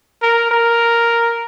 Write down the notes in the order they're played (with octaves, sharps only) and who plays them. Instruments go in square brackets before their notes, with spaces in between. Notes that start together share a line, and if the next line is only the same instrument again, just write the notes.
[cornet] A#4
A#4